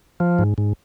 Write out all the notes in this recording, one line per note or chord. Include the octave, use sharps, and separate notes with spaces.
F3
G#2
G#2